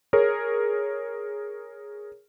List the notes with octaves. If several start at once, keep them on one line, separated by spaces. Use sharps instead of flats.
G#4 A#4 C#5